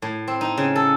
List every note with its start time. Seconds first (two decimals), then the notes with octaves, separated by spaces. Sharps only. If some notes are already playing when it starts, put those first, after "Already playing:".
0.02 A2
0.27 C4
0.41 D#4
0.57 C#3
0.76 A4